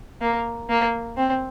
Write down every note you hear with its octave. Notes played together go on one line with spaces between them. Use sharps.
A#3
A#3
C4